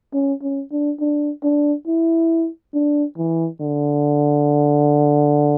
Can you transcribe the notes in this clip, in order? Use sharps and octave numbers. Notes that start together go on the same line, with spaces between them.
C#4
C#4
D4
D4
D4
E4
D4
E3
D3